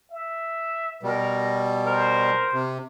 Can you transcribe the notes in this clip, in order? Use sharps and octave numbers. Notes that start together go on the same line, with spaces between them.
E5
B2 G3 A#4
A#4 C5
C3